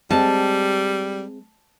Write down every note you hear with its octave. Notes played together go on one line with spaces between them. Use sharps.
G3 G#3 C4 A5